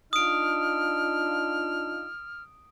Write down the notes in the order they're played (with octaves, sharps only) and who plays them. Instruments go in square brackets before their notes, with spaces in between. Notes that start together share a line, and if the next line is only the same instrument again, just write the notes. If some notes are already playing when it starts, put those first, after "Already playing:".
[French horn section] D4 D#4 F4 [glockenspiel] D#6 D7 [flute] F6